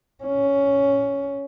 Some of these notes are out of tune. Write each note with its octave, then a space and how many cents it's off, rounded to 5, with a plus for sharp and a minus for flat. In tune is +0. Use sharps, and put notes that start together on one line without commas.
C#4 +10